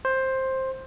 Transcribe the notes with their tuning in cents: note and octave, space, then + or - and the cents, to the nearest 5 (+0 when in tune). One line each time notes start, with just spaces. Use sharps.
C5 +10